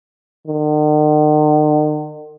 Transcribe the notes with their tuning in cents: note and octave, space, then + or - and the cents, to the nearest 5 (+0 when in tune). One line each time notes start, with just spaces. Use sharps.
D#3 -45